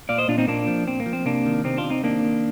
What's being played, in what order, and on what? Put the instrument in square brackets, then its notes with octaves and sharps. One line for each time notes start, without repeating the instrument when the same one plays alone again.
[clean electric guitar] A#2 D5 F5
C5 D#5
A#2 D4 F4
C4 D#4
A#2 A#3 D4
F3
A#2 C4
A#3
F3
C4
C3 A#3 D4
D#3
C3 C4 D#4
D4 F4
C3
C4 D#4
D#3 A#3 D4
D#3